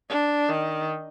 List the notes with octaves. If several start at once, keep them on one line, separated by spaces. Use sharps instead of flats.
D4
D#3